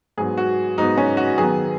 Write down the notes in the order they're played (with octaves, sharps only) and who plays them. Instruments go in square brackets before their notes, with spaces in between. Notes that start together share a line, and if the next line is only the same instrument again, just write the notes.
[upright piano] G#2 F#3 B3 G#4
F#4
G#2 F#3 B3 D#4
C#4
F#4
F#2 D#3 B3 G#4